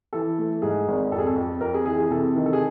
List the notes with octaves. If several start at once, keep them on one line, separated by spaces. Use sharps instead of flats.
E3 A4
A3
G#2 G#4
G#1
F2 A4
G#4
A4
F2
F2 A#4
G#4
E3 G#4
G#4
C3 A4
D#3
A4
G#4